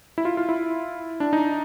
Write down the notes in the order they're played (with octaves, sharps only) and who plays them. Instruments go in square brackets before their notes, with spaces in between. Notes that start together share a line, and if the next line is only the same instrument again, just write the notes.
[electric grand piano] E4
F4
F4
E4
D4
D#4